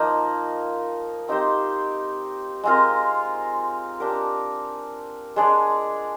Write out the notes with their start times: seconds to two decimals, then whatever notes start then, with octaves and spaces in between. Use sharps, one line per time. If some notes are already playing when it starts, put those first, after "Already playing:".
Already playing: F3 A#3 D#4
1.28 C4 D#4 G4 C5
2.63 G#3 C4 F4 A#4
4.00 D4 G4 A#4
5.36 G#3 D4 G#4 D5